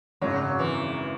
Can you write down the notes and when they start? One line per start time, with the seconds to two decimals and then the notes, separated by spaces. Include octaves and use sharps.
0.21 G#1 F#2 C#3 F#3
0.59 E3